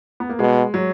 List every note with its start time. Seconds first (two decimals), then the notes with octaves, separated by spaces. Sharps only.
0.20 B3
0.29 A#3
0.39 B2 G#3
0.74 F#3